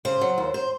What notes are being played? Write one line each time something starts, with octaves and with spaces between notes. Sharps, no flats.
C#3 C5
F#3
D#2
C5